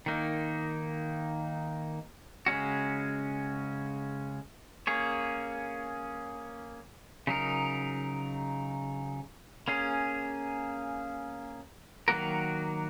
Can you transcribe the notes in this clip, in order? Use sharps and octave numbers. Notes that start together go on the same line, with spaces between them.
D#3 A#3 D#4
C#3 G#3 C#4 F#4
A#3 C#4 G#4 C#5
C#3 F#3 D#4 A#4
A#3 C#4 G#4
D#3 F#3 A#3 F#4 A#4